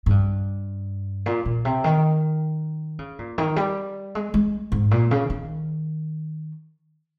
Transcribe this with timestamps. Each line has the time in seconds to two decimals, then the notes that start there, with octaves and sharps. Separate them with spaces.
0.06 G#2
0.10 G2
1.26 A#2
1.45 A#2
1.65 C3
1.84 D#3
2.99 C#3
3.19 A#2
3.38 D#3
3.56 G3
4.15 G#3
4.34 G#3
4.72 G#2
4.91 A#2
5.11 C#3
5.30 D#3